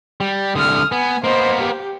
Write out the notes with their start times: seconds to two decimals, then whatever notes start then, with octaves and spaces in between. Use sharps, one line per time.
0.21 G3
0.55 C2 D3 D#6 F6
0.92 B3 G#5
1.24 A#3 B3 C5 D#5
1.59 G4